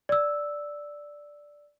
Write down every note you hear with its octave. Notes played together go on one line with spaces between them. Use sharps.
D5 E6